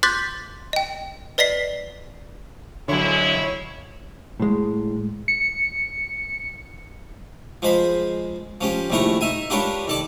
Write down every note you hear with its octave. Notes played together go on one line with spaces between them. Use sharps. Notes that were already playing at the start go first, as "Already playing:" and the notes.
C6 D6 F#6 G6 A6 B6
D#5 G5
B4 D5 D#5 B6 C7
F2 D3 F#3 G#3 E4 C#5
A2 G#3
C#7
F3 G#3 C5 B5
F3 C#4 G4
A#1 D#2 A3 E4 A#4 C#5
D#4 E5 G#5
D4 F4 G4 A#4 B4 C#5
D#2 A4 D5